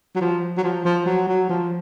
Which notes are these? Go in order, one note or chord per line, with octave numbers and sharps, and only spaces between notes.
F#3
F3
F#3
F3
F3
F#3
F#3
F3